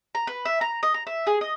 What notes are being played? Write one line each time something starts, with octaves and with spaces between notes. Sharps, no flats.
A#5
B4
E5
A#5
D#5
A#5
E5
G#4
D#5